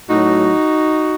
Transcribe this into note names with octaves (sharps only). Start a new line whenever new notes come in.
A2 F#3 D#4 F#4